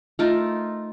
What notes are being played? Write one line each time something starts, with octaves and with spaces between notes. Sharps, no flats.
A3 D#4 F4 A#4